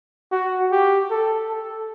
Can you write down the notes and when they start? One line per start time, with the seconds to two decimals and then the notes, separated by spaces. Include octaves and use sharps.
0.32 F#4
0.72 G4
1.11 A4
1.49 A4